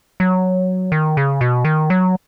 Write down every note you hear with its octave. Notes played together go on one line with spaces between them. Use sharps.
F#3
D#3
C#3
B2
D#3
F#3